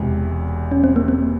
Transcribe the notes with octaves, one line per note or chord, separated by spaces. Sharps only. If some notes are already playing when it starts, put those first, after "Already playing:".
Already playing: E1 E2 C3 G#3
C#4
C4
A#3
C4